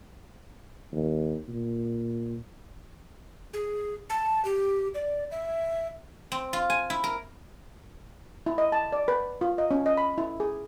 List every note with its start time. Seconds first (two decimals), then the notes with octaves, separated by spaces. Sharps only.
0.92 D#2
1.48 A#2
3.53 G#4
4.10 A5
4.45 G4
4.94 D5
5.31 E5
6.32 C4
6.53 F4
6.70 G#5
6.90 E4
7.04 A#4
8.46 E4
8.58 D#5
8.72 A5
8.92 D5
9.08 B4
9.41 F4
9.58 D#5
9.71 C#4
9.86 D#5
9.98 B5
10.18 E4
10.40 G#4